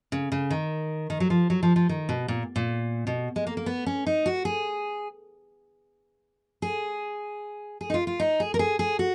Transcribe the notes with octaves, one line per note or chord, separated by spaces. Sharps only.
C#3
C#3
D#3
D#3
F#3
F3
F#3
F3
F3
D#3
B2
A#2
A#2
B2
G#3
A#3
A#3
B3
C#4
D#4
F#4
G#4
G#4
G#4
D#4
F4
F4
D#4
G#4
A#4
G#4
G#4
F#4